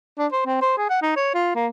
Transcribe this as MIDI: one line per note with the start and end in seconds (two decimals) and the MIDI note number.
0.18 0.27 62
0.32 0.45 72
0.46 0.62 60
0.62 0.74 72
0.78 0.89 68
0.90 0.99 78
1.02 1.12 63
1.16 1.30 73
1.34 1.54 65
1.55 1.67 58